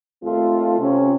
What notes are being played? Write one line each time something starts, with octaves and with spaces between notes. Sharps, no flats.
D#2 A3 C4 F4
C3 C#4